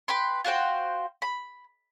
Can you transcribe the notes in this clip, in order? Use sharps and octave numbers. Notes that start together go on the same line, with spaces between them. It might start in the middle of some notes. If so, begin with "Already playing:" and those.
B4 G5 B5 C6
F4 F#4 C5 G5
B5